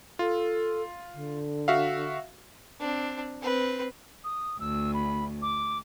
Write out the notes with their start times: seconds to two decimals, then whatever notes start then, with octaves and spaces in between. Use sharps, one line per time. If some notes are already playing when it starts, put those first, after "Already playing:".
0.19 F4 A4
1.13 D3
1.68 F#4 E5 F5
2.80 C4 D4
3.42 C4 B4
4.24 D#6
4.60 D2 E6
4.94 B5
5.42 D6